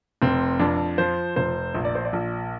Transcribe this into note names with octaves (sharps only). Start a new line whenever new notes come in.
F1 C4
F2 D4
F3 C5
F1 C5
A#1
D5
C5
D5
A#1